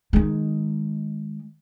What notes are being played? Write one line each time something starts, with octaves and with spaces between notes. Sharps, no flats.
D#3 G#3